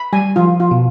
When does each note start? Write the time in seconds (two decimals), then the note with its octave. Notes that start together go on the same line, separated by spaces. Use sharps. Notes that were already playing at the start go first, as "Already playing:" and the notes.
Already playing: B5
0.13 G3 G#5
0.36 F3 F4
0.60 F4
0.71 B2